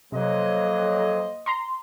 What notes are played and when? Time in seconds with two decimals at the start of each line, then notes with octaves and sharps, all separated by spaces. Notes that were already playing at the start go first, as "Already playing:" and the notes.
0.12 F2 C3 F#3 A#3 C5 D#5
1.46 A#5 C6